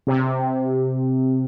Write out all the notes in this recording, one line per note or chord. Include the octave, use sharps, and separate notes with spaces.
C3